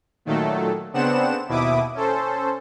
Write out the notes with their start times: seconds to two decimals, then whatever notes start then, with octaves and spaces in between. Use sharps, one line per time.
0.25 A#2 D#3 F#3 A3 A4
0.93 C#3 B3 C4 D4 F#5 E7
1.48 D#2 B2 E4 E5 D6 D#6
1.94 C#4 A4 C5